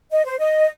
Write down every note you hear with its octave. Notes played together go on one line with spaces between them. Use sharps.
D#5
C5
D#5